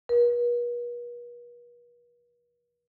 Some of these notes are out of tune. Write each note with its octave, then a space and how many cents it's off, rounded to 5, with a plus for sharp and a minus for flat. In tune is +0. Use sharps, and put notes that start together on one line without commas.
B4 -45